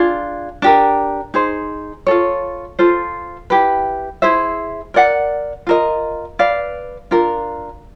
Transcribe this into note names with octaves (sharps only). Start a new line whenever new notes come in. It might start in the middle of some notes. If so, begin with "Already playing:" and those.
Already playing: D4 F4 G#4
D4 G4 A#4
D#4 G#4 C5
F4 A4 C#5
F4 A4 C5
E4 G4 B4
E4 G#4 C5 E5
A#4 D5 F#5
F4 A#4 D#5
B4 D5 F5
D4 F4 A#4